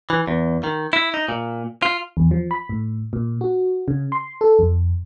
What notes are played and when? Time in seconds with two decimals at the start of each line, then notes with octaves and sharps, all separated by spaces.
0.10 E3
0.27 E2
0.64 D#3
0.93 E4
1.14 D#4
1.28 A#2
1.82 F4
2.17 E2
2.31 F3
2.51 B5
2.69 A2
3.13 A#2
3.41 F#4
3.88 C#3
4.12 C6
4.41 A4
4.59 F2